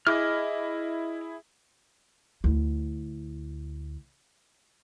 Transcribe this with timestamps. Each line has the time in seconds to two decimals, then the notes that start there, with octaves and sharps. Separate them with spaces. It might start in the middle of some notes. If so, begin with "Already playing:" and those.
0.07 E4 G#4 D#5 D6 F6
2.44 D2 E4